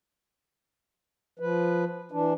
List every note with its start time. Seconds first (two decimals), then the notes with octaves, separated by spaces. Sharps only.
1.39 F3 B4
2.12 E3 D4